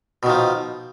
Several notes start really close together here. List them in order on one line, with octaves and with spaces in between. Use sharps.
B2 D#3 F3